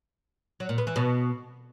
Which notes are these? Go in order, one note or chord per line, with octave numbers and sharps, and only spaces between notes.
F#3
A#2
B3
E3
B2